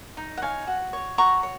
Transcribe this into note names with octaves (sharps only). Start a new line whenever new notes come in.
D#4
F#5
C#5 F5 G#5
F#4
C#5
F#4 A#5 C#6
C#5